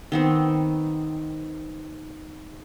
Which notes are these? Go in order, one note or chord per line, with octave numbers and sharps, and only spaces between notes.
D#3 B3 C4